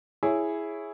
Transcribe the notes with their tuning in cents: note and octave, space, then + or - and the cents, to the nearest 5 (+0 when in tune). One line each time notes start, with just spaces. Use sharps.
E4 +0 G#4 +0 C#5 +0